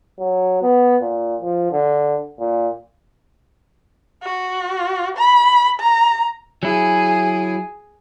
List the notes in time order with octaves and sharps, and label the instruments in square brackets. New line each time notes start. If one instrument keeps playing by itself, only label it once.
[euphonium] F#3
B3
A#2
F3
D3
A#2
[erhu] F#4
B5
A#5
[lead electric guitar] F#3 E4 [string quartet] G#4 G#5